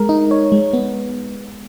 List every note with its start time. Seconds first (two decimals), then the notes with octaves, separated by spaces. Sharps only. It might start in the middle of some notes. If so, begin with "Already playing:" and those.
Already playing: G#3 A#4
0.09 D#4
0.31 C#5
0.52 G#3
0.73 B3